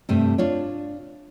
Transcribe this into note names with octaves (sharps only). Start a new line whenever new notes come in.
G2 C3 A3
D4 F4 C#5